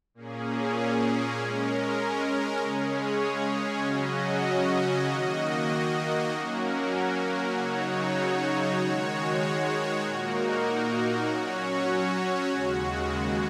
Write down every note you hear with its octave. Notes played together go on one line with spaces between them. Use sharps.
A#2 A#3 C#4 G#4
G#3 C#4 A#4
C#3 G#3 C#4 G#4 C#5
C#3 F#3 C#4 F#4 D#5
D#3 A#3 F#4 D#5
F#3 A#3 C#4 F#4 A#4
C#3 F#3 D#4 F#4 C#5
D#3 G#3 F#4 C#5
A#2 A#3 D#4 F#4 A#4
F#3 C#4 F#4 C#5
D#2 C#3 G#3 F#4